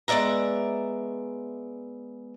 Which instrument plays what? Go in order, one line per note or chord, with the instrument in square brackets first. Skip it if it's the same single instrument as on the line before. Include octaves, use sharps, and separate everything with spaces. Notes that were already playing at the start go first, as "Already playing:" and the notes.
[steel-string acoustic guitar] G#3 B3 D5 E5 A#5